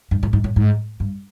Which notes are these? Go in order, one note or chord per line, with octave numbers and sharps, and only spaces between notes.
G2
A2
G#2
A2
G#2
G2